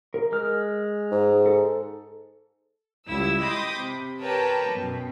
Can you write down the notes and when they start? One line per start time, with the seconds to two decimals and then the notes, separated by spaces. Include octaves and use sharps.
0.14 A#4
0.32 G#3 F6
1.11 G#2
1.46 A4
3.08 C#2 G3 E4 E6
3.41 D#5 G5 B5 C6 D6 D#6
3.77 C3
4.21 G4 A#4 B4 C#5 G5 A5
4.69 F#2 B2